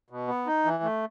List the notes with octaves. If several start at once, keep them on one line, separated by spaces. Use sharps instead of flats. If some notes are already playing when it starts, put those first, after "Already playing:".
B2
B3
D#4
E3
A3